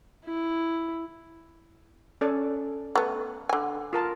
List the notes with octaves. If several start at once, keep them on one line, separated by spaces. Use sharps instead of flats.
E4
C#4 A4 D5
A3 B3
D3 G#5
F4 A#4 A5